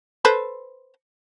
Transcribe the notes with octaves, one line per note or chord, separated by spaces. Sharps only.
A4 B4 C5